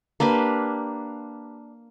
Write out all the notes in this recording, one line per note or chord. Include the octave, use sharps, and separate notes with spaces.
A#3 D4 G4 B4